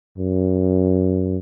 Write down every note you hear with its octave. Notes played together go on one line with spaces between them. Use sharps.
F#2